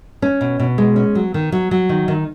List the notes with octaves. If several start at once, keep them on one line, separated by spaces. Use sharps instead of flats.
C#4
B2
B2
G#3
C#4
F#3
D#3
F#3
F#3
D#3
D#3